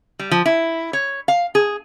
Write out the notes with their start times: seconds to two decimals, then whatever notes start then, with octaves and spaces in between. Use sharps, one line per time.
0.19 G3
0.31 F3
0.46 E4
0.93 C#5
1.28 F5
1.55 G#4